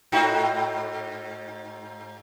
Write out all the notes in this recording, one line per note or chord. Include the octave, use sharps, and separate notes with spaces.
G#2 D#4 F#4